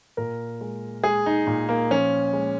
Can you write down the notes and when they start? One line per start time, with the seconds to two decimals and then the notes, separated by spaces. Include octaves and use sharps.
0.17 A#2 A#4
0.61 G#3
1.04 G#3 G#4
1.26 D#4
1.47 A#2 D#4
1.69 A#3
1.91 F3 C#4
2.33 G#3